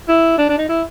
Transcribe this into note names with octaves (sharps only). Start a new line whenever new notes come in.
E4
D4
D4
D#4
E4